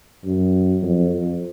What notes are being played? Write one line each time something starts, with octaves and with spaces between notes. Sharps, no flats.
F#2
F2
F2